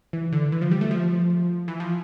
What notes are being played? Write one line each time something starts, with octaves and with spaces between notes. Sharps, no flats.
E3
D3
E3
F3
G3
A3
F3
E3
F3